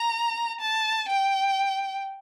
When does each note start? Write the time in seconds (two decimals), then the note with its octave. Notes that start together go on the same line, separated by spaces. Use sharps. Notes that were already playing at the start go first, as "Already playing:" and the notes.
Already playing: A#5
0.61 A5
1.09 G5